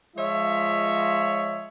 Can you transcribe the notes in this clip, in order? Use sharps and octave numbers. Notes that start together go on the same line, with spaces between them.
F3 G#3 F4 C#5 D#5 E5